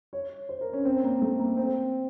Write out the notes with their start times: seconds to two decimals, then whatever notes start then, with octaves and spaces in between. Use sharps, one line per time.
0.13 C#5
0.49 C5
0.61 A#4
0.73 C#4
0.85 C4
1.04 A#3
1.22 A3
1.39 A#3
1.57 C4